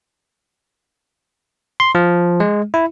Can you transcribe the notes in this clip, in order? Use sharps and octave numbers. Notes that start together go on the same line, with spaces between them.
C6
F3
G#3
E4